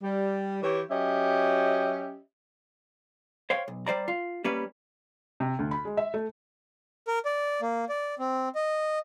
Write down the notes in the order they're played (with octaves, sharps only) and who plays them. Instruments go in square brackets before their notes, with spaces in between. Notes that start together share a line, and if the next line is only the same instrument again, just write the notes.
[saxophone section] G3
E3 G4 C#5
F#3 C#4 G4 D#5 E5
[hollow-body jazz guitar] C5 C#5 F5 G5
B1
G3 C5 D5 A#5
F4
G3 A#3 C#4 B4
[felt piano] C3
D2
B5
G#3
E5
A3
[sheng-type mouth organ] A#4
D5
A#3
D5
C4
D#5